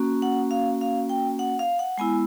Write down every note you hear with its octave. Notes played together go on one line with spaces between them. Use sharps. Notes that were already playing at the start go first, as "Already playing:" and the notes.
Already playing: A#3 C#4 F#4
F#5
F5
F5
G5
F#5
F5
F#5
G#3 B3 E4 G#5